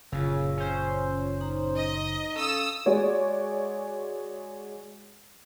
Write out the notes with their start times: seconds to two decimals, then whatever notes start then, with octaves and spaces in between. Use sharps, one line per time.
0.12 F#1 A#2 C#3 F4 E6
0.57 C#4 C5
1.41 D#4 A#5
1.76 D#5
2.36 C#4 A4 F5 D#6 E6
2.86 G#3 F#4 C#5 D5